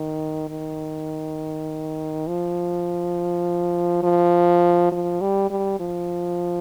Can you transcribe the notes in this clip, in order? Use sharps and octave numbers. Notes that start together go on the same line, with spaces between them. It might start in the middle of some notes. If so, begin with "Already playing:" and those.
Already playing: D#3
D#3
F3
F3
F3
G3
G3
F3